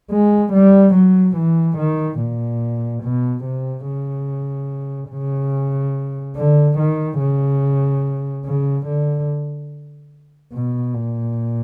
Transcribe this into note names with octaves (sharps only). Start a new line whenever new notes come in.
G#3
G3
F#3
E3
D#3
A#2
B2
C3
C#3
C#3
D3
D#3
C#3
C#3
D3
B2
A#2